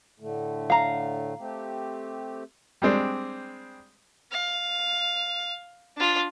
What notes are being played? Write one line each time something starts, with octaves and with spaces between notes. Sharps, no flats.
A2 D3 A3
F5 A#5
A3 C4 G4
G3 G#3 C4 D4
F5
D4 F4